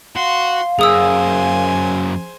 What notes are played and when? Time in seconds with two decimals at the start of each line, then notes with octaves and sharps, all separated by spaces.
0.16 F#4 F5 C6
0.79 F#2 A#3 G#4 C5 G#5 D#6 E6